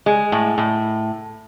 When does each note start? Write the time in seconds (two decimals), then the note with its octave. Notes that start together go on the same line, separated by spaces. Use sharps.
0.06 G#3
0.32 A2
0.58 A2